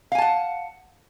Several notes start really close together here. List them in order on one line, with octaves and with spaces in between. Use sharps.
F5 G#5 A5 F#5